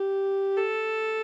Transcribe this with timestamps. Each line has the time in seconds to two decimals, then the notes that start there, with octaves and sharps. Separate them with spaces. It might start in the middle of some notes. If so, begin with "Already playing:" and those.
Already playing: G4
0.57 A4